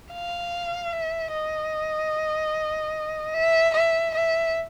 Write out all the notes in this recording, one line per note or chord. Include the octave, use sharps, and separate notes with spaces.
F5
E5
D#5
E5
E5
E5